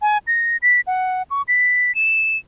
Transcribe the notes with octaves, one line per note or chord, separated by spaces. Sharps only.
G#5
A#6
B6
F#5
C#6
B6
E7